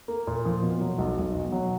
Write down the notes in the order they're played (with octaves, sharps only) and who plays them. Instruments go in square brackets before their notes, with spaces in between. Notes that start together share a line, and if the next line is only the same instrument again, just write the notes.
[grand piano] A#3
A#2
F3
B2
F#3
B1
B1
B2
F#3